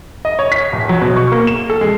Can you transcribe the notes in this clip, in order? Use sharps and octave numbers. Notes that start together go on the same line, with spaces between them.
D#5
C#5
B6
D1
F#3
B2
C#6
A#3
E7
A4
G#3